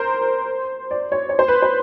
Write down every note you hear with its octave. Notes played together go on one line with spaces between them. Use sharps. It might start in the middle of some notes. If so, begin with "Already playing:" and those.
Already playing: A#4 C5
D5
C#5
C#5
C5
B4
C5